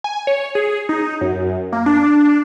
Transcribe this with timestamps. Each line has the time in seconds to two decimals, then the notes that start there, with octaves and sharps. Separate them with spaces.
0.04 G#5
0.27 C#5
0.55 G#4
0.89 D#4
1.21 F#2
1.73 A#3
1.86 D4